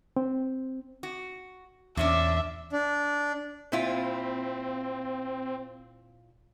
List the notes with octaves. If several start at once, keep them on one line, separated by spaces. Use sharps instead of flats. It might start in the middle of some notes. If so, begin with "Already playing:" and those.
C4
F#4
E2 A#2 C#4 D4 E5
D4
A#2 C4 E4 F4